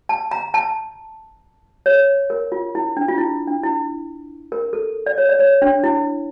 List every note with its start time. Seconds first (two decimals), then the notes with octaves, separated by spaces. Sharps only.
0.09 A5
0.31 A#5
0.54 A5
1.86 C#5
2.30 A#4
2.52 F4
2.75 E4
2.97 D4
3.08 F4
3.18 E4
3.48 D4
3.64 E4
4.52 A#4
4.73 A4
5.06 D5
5.18 C#5
5.29 D5
5.39 C#5
5.62 D4
5.84 E4